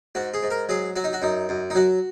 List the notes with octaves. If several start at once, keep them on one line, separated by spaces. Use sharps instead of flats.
G#2 F#4
G#4
G#2
A#4
F#3 G#4
F#3 F#4
D#4
F#4
F#2 D#4
F#2
D#4
F#3 F#4